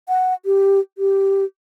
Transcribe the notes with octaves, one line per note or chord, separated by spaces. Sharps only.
F#5
G4
G4